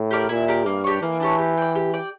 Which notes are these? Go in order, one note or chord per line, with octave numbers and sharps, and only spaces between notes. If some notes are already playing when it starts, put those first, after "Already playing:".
Already playing: A2
G4 A#4 D5
A#2 E4
G4 A#4 D5
G2 A#3
D4 G4 C#5
E3 A#3
D4 G4 C#5
G4
D5 G5
G4
D5 G5